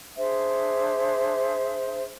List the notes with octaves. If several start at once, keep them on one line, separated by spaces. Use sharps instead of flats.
D4 G#4 C5 E5